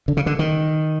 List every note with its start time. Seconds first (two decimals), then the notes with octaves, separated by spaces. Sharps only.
0.08 D3
0.17 C#3
0.26 D3
0.39 D#3